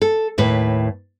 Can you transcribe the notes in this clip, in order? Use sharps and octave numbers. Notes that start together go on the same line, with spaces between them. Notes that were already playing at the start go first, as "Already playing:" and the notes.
A4
D#2 A2 B4